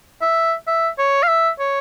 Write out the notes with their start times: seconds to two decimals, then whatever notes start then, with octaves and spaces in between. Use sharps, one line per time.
0.22 E5
0.67 E5
0.98 C#5
1.23 F5
1.28 E5
1.60 C#5